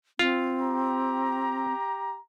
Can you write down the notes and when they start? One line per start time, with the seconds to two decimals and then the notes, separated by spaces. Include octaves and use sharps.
0.19 C4 F4
0.60 G4 A#5